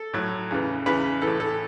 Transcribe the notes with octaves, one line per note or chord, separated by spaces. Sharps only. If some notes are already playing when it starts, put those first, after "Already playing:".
Already playing: A4
A2 F#3
E2 C#3 E3
E2 C#3 E3 B4
E3 A4
A2
A4